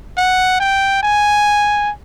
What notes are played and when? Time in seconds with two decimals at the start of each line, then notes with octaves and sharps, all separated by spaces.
0.18 F#5
0.60 G5
1.03 G#5